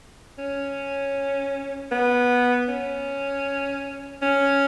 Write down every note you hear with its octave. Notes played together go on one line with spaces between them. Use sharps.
C#4
B3
C#4
C#4